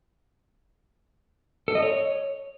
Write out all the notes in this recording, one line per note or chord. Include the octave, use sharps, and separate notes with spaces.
A4
D#5
C#5